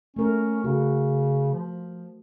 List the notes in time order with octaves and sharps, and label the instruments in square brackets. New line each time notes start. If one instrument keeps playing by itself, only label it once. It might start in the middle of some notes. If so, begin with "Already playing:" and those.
[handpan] A3 A#4 [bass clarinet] C#4
[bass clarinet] C#3 [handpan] F#4
[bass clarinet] F3